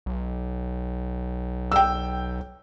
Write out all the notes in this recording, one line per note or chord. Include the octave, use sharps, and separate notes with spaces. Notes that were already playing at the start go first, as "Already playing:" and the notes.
B1
G5 E6